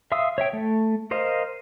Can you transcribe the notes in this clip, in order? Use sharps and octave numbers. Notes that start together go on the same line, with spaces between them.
E5 F5 C6 D#6 E6
C#5 E5 G5
A3
A#4 C5 D#5 F5